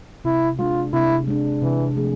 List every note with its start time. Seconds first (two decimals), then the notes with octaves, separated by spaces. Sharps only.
0.24 C3 E4
0.59 G#3 D4 F4
0.93 C3 E4
1.28 G#3 D4
1.62 C3 E3
1.97 F3 A3 D4 G#4